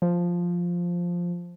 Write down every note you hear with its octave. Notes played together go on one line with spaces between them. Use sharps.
F3